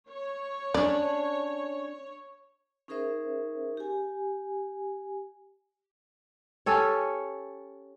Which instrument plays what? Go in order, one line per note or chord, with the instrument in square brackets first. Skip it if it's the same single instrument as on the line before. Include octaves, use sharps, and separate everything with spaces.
[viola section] C#5
[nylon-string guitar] C#4 D4 [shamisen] D5
[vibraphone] C#4 D#4 G#4 A#4 C5 E5
G4 G#5
[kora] C#4 G4 A4 C#5